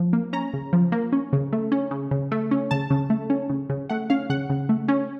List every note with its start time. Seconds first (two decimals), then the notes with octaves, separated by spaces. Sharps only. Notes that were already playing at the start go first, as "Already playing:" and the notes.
Already playing: F3
0.13 A#3
0.33 C#4 A#5
0.53 C#3
0.73 F3
0.92 A#3
1.12 C#4
1.33 C#3
1.53 A3
1.72 C#4
1.91 C#3
2.11 C#3
2.32 A3
2.51 C#4
2.71 C#3 A5
2.90 C#3
3.10 A3
3.30 C#4
3.50 C#3
3.70 C#3
3.89 A3 F#5
4.10 C#4 F5
4.30 C#3 F#5
4.50 C#3
4.69 A3
4.88 C#4